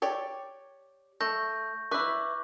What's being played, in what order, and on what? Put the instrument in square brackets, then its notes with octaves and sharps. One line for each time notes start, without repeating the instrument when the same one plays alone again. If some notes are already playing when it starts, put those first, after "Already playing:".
[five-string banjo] G4 C#5 D5
[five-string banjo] A3 [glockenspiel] C#6 G6 A#6
[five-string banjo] E4 B4 [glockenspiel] C#6 D6 F#6